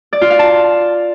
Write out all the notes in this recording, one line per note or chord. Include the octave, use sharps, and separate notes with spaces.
D5
F4
F5
A5